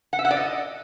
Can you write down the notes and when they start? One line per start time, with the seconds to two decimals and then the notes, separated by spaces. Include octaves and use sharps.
0.13 F#5
0.19 E5
0.25 F#5
0.31 D5
0.37 D#5